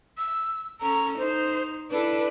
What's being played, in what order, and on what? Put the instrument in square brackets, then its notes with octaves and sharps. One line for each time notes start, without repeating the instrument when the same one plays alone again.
[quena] E6
[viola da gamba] C#4 A4 [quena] A#5
[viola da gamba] D#4 [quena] C5
[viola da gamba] D4 E4 A4 [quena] B4